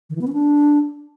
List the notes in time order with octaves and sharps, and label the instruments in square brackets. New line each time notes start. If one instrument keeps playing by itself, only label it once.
[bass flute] D#3
E3
B3
C#4
D4